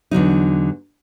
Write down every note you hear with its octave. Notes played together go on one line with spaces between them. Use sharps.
E2 D3 F#3 D#4